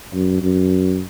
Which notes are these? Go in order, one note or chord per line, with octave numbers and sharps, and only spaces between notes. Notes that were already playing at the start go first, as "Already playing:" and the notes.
F#2
F#2